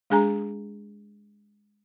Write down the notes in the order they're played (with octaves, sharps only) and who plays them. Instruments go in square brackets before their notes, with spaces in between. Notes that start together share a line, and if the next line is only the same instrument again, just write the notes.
[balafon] G#3 D4 G#4 G#5 A#5